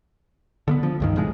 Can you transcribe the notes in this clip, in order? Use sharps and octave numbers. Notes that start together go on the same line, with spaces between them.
D3 A#3 B3
F3
C#2 G2 D#3
F1 A2 F3 G#3